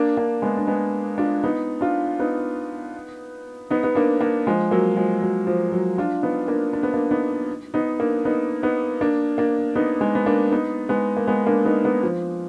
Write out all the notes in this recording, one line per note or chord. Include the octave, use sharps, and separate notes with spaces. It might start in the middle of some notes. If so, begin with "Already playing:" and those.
Already playing: A#3 D4
A#3 D4
G#3 B3
D4
G#3 B3
D4 F4
B3 D#4
D4 F4
B3 D#4
B3 D#4
B3
A#3 D4
A#3 D4
F3 G#3
F#3 A#3
F3 G#3
F#3
F3
F#3
D4 F4
B3 D#4
A#3 D4
D4
B3
A#3 D4
B3 D#4
B3 D#4
A#3 D4
B3 D#4
B3 D#4
A#3 D4
A#3 D4
B3 D#4
G#3 B3
B3
A#3 D4
B3 D#4
G#3 B3
A#3
G#3 B3
A#3 D4
B3 D#4
B3 D#4
F3